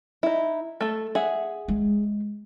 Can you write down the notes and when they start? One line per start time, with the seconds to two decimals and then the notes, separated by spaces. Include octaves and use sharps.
0.23 D#4 E4
0.81 A3 A4
1.15 G#4 E5 F#5
1.68 G#3